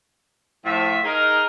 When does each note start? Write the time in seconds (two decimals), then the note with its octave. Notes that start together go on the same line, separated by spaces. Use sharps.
0.65 A2 F3 E5
1.04 D#4 G#4 A#4